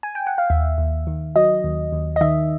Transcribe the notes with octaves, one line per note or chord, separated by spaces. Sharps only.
G#5
G5
F#5
F5
D#2 E5
D#2
D#3
F#3 D#5
D#2
D#2
D#5
D#3 E5